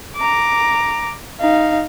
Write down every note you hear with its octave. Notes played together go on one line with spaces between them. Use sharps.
A#5 D6
D#4 F5